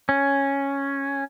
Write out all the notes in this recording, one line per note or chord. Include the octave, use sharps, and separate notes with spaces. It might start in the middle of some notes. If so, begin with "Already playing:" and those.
C#4